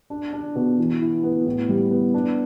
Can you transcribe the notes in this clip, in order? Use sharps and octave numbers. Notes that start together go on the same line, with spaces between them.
D4
D4
B2
E3
E4
B3
A2
G3
B3
D4